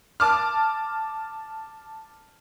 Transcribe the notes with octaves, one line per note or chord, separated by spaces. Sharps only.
A5 D6 F6